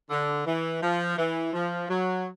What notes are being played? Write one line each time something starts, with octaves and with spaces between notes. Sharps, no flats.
D3
E3
F3
E3
F3
F#3